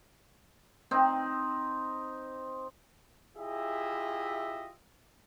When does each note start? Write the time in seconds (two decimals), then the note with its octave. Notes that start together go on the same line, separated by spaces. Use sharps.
0.91 C4 D#4
3.36 E4 F4 G4 G#4 D#5 E5